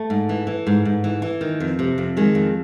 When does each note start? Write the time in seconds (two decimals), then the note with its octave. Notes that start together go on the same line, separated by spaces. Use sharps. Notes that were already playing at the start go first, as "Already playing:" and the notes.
Already playing: A3
0.10 G#2
0.29 E3
0.47 E3
0.67 G#2
0.85 G#2
1.04 E3
1.22 E3
1.41 D#3
1.60 F2
1.79 C3
1.98 F2
2.17 D#3 G#3
2.35 F2